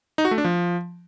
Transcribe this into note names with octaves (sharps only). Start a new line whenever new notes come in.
D#4
F#4
A3
D4
F3